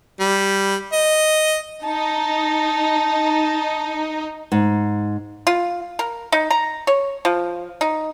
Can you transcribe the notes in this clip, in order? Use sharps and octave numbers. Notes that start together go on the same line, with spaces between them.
G3
D#5
D#4 A5
G#2
F4
A#4
D#4
A#5
C#5
F3
D#4